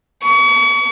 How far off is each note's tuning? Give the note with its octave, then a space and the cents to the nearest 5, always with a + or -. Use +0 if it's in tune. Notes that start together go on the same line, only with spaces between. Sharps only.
C#6 +35